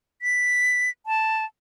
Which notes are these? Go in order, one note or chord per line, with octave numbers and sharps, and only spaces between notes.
B6
A5